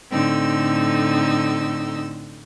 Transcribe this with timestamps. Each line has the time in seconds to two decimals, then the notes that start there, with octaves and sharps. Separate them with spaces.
0.12 A2 D3 C4 D#4 E6